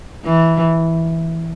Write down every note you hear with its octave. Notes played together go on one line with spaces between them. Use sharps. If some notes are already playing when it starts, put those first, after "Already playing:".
E3